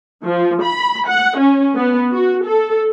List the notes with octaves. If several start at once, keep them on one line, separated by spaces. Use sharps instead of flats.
F3
B5
F#5
C#4
B3
F#4
A4